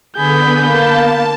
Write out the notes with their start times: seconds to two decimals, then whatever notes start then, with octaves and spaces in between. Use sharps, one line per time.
0.17 D3 B3 G#4 B5 G6
0.67 A#3 A5